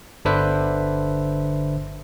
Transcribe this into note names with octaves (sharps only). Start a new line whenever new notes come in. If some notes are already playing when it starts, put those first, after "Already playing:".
G1 D3 D4 B4 C5 E5